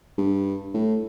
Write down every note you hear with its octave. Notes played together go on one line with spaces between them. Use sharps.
G2
A2